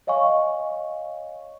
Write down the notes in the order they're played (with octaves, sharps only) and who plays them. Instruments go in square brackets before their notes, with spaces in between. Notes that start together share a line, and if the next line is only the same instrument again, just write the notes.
[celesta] C#5 D#5 F5 G#5 C#6